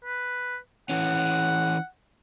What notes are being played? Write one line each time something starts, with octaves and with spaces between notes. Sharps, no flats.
B4
E3 C#4 F#5